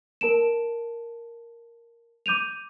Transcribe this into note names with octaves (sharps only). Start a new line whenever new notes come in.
A#4 A5 D7 E7
D6 G6 D#7 F7